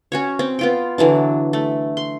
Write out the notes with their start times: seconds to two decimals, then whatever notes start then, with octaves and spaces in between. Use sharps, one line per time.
0.12 C#4 F#4 C#5
0.39 C4
0.59 B3 F4 G5
0.98 D3 E3 F#3 D4
1.53 A3
1.97 C6